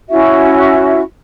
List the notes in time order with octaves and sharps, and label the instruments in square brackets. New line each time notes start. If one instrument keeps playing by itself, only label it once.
[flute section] C#4 E4 F#4 E5